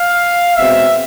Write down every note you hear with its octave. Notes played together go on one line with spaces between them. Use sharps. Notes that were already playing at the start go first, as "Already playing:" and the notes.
Already playing: F5
B2 G#3 C4 E5